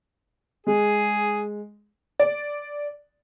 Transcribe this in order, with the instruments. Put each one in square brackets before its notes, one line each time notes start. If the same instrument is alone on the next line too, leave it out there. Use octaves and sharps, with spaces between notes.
[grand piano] G#3 [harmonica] G#4
[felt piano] D5